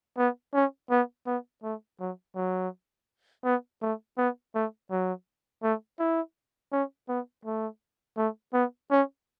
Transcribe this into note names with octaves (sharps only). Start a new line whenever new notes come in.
B3
C#4
B3
B3
A3
F#3
F#3
B3
A3
B3
A3
F#3
A3
E4
C#4
B3
A3
A3
B3
C#4